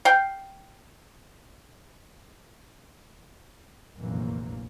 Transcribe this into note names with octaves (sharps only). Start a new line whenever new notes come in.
F5 G5
F1 A#1 F#2 E3 A#3